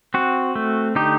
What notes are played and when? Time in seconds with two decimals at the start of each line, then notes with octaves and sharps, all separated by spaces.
0.14 C4 F#4
0.55 A3
0.95 D3 D#4 G4